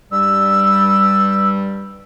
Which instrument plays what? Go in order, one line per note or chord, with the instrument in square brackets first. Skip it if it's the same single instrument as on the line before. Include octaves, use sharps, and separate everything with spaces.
[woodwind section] G2 G3 [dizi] E6